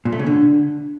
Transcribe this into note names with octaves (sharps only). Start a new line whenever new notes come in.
A#2
A3
C#3
D3